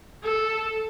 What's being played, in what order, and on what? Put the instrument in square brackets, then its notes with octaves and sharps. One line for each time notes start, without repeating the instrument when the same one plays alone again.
[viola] A4